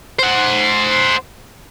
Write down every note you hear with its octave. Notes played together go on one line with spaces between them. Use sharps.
C5 F#5